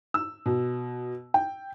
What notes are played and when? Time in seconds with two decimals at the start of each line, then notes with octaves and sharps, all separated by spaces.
0.14 E6
0.46 B2
1.34 G5